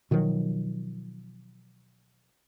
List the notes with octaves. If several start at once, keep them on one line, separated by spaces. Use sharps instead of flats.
B2 D#3 F3 F#3